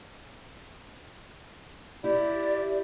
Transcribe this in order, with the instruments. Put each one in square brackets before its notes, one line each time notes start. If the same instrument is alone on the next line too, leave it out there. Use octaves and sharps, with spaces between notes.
[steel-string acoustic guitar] E4 [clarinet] G4 [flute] D5